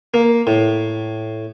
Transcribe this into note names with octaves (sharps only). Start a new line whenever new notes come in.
A#3
A2